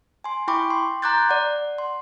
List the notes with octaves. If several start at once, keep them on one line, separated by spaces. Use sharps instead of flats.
G#5 C6
E4 G5 B5 C#6 D6
C6
A#5 C6 D6 F#6 G6 A6
D5 F#5
C6